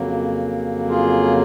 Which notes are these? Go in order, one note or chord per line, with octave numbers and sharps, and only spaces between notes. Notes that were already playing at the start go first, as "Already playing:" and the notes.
Already playing: F2 C#3 F#3 A#3
F4 G#4